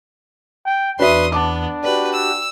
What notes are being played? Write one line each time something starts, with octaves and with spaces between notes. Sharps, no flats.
G5
E2 D4 F#4 B4 E5 C6 D#6
B3 D4 A5 D6
F#4 G4 B4 D5
E6